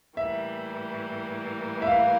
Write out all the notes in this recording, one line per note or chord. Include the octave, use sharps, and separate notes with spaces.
A2 E3 G3 A#3 E5
E5
F5